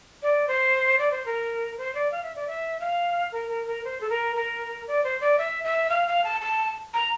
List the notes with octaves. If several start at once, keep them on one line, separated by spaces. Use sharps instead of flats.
D5
C5
D5
C5
A#4
C5
D5
F5
E5
D5
E5
F5
A#4
A#4
A#4
C5
A4
A#4
A#4
D5
C5
D5
E5
E5
F5
F5
A5
A5
A#5